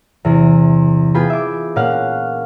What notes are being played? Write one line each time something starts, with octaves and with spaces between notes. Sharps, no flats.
E2 C3
B3 F4 G#4 G5 B5
E5 D6
A#2 C#4 F5 F#5